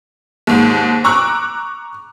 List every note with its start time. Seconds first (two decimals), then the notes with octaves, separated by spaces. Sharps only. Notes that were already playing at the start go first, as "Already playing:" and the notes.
0.47 D#2 G#2
1.04 A#5 C#6 D6 E6 F#6